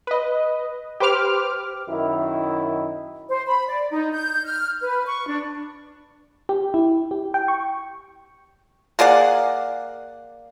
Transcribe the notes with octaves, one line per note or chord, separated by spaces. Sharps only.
B4 D#5
G4 B4 C5 D6 F6
F#2 D#3 E4
C5
B5
D5
D#4
G6
F6
B4
C#6
D4
G4
E4
G4
G5
C#6
A#3 G#4 D5 F#5